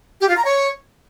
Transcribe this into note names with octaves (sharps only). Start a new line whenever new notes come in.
G4
F4
A#5
C#5